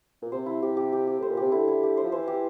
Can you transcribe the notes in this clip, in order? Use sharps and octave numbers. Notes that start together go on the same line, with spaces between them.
A#2
C3 C5
E4
C3 G4
G4
G4
G4
A2 C5
A#2
C3 G4
D3 E4
E4
G4
C5
F3
E3 C5
G4